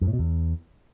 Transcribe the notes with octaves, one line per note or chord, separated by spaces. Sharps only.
F#2
A2
B2
E2